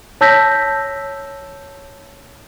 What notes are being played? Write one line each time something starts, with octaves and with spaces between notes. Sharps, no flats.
C#5 A5 E6 G6 A#6 B6